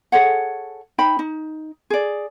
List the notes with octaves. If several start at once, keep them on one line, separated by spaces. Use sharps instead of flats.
G#4 A4 C#5 F#5
D#4 C5 G5 B5
D#4
G#4 D5